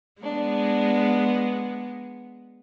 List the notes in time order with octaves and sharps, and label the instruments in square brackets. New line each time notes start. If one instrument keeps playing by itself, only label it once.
[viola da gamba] G#3 B3 [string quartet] D4